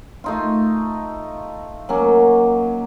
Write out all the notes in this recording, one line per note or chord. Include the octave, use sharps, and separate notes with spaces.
A3 D#4 F4
F#3 A#3 C#4